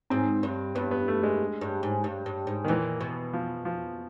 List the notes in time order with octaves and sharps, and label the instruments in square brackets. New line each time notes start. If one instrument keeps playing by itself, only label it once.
[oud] G#2 [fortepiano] C4
[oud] G2
[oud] G2 [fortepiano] B3
[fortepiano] B3
A3
G#3
[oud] G2
G#2
G2
G2
G#2
[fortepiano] D#3
[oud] A#2 [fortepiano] E3
[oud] B2
[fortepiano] F3
F3